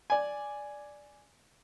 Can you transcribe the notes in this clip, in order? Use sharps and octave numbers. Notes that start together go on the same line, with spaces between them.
D5 G#5